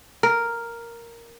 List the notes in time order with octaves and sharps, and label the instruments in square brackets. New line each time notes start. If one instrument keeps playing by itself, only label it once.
[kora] A#4